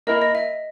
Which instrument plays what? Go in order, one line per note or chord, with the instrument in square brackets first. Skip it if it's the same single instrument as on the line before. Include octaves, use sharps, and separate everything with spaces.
[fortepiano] A#3 E4 A#4 [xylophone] D#5
[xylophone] D#5
E5